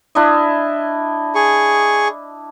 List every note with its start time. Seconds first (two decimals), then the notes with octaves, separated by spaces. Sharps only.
0.15 D4 E4 D#5
1.35 G#4 C#6